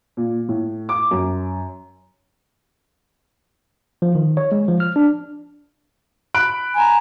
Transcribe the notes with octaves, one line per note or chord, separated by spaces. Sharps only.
A#2
A2
D6
F#2
F3
D#3
C#5
G#3
F3
F6
D4
B5 F#6 D7
G#5 A#5